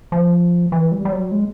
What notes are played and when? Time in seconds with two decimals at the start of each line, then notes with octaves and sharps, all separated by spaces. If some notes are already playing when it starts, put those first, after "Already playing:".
0.12 F3
0.72 E3
0.92 G3
1.05 G3
1.12 F#3
1.32 G#3